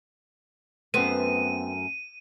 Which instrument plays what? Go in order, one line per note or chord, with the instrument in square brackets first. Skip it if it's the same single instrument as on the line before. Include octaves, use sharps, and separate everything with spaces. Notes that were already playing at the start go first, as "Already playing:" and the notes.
[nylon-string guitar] F#2 A3 [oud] B3 C4 [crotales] D#7